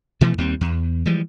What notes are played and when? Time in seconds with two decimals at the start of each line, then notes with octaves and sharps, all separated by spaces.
0.21 B2 E3 F3 A3
0.38 D#2 G3 C4
0.61 E2
1.05 E3 F3 G3 G#3